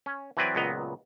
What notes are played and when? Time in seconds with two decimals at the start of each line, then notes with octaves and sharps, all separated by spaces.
0.06 C#4
0.37 E3 F#3 C4 B4 D5 G#5
0.55 C#2 A#2 F#3 B3 D#5 A#5